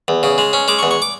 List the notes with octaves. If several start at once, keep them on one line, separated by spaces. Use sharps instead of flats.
E2
C#3
G#3
C#4
G#3 D6
C#6
E2
C#6
D6